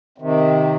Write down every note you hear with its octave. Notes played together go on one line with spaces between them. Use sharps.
C3 D#3